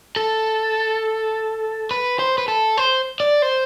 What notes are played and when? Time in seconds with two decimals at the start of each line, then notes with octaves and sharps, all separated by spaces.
0.16 A4
1.91 B4
2.19 C5
2.38 B4
2.48 A4
2.77 C5
3.20 D5
3.42 C5